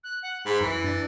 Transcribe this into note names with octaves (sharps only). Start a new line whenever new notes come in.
F#6
F#5
G#2 B5
F#2 E3
D4 A6